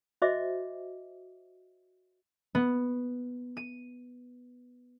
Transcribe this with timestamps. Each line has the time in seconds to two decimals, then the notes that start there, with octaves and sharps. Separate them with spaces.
0.22 F#4 C5 D#5 E5 D6
2.55 B3
3.57 D#7